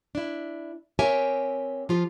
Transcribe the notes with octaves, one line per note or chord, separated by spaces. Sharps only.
D4 E4
C4 G4 A#4 C#5 E5 G#5
F3 F4 G4